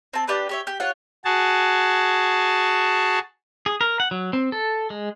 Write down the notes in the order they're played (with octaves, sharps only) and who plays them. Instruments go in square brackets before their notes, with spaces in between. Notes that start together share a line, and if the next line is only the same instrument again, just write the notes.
[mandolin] C4 A5
D4 G4 B4 A5
G4 C#5 E5
G4
F4 C#5 F#5
[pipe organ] F#4 G#4 A5
[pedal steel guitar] G#4
A#4
F#5
F#3
C4
A4
G#3